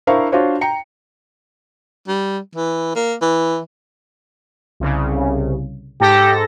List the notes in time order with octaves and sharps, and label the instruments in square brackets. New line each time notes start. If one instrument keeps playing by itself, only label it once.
[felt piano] D4 E4 A#4 C5 F5 C#6
D4 F4 F#4 C5 C#5
G5 A#5 C#7
[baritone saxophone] G3
E3
A#3
E3
[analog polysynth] C2 C#3
[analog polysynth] G#2 A4 A#6 [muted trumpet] G4